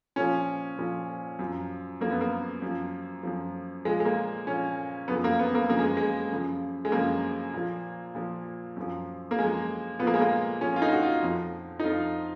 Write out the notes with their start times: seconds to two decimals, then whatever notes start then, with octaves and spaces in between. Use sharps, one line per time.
0.16 A#2 F3 C#4
0.78 A#2 F3
1.39 F#2 F3
2.01 F#2 F3 A#3
2.11 B3
2.21 A#3
2.62 F#2 F3
3.23 F#2 F3
3.85 A#2 F3 G#3
4.00 G#3
4.05 A#3
4.47 A#2 F3 C#4
5.08 F#2 C#3 F3 B3
5.24 A#3
5.39 B3
5.55 A#3
5.70 F#2 C#3 F3 A#3
5.79 G#3
5.97 G#3
6.31 F#2 C#3 F3
6.85 G#3
6.92 F#2 C#3 F3 A#3
7.54 A#2 F3
8.15 A#2 F3
8.76 F#2 F3
9.31 A#3
9.38 F#2 F3 G#3
9.99 A#2 B3
10.03 F3 A#3
10.14 G#3
10.21 A#3
10.61 A#2 F3 C#4
10.76 F4
10.82 D#4
10.92 F#4
11.03 F4
11.22 F2 F3
11.79 D#4
11.84 F2 F3 F4